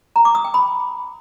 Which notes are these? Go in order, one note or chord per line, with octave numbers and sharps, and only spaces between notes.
A#5
D6
D#6
G5
B5